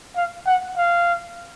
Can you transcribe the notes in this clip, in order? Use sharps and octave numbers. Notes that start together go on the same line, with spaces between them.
F5
F#5
F5